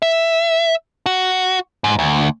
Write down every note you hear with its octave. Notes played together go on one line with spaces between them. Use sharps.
E5
F#4
G#2
D2